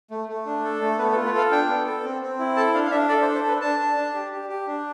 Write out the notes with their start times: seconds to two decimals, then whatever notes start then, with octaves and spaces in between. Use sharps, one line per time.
0.11 A3
0.29 A3
0.46 D4
0.64 A4
0.81 A3
0.99 B3 B4
1.12 A4
1.16 F4
1.25 B4
1.34 A4 F5
1.51 D4 G5
1.69 B3
1.86 A4
2.04 C4
2.22 C4
2.39 E4
2.56 A4 A5
2.74 D4 F5
2.86 F5
2.91 D4 E5
3.09 A4 D5
3.22 C5
3.27 D4
3.35 C5
3.44 D4 B4
3.61 D4 A5
3.79 D4
3.96 D4
4.14 G4
4.32 G4
4.49 G4
4.67 D4